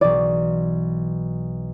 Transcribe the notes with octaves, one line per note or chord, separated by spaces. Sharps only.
B1 B2 E3 D5